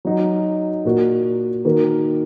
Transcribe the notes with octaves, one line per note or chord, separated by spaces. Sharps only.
F#3 D#4 F#4
A#2 A#3 F#4
D#3 A#3 F#4